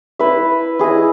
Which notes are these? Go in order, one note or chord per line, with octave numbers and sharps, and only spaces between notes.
E4 B4 E5
E4 G#4 D#5